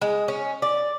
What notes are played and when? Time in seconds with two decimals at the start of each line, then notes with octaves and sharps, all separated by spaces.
0.02 G#3
0.28 C#4
0.62 D5